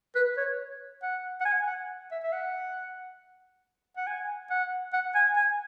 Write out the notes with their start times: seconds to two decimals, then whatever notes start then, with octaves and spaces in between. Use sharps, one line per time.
0.16 B4
0.37 C#5
1.03 F#5
1.40 F#5
1.45 G#5
1.67 F#5
2.12 E5
2.24 E5
2.32 F#5
3.97 F#5
4.07 G#5
4.50 F#5
4.93 F#5
5.15 G#5
5.37 G#5